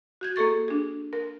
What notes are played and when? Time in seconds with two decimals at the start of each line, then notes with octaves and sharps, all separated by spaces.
0.21 F#4 G6 G#6
0.36 A#3 G#4 A4 C#6 A6
0.68 D4 G#4
1.13 A#4